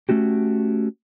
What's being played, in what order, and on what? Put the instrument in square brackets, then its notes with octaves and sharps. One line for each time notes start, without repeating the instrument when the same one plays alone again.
[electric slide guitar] A3 C#4 F#4 G4